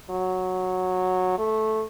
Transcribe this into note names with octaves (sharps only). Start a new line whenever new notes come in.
F#3
A3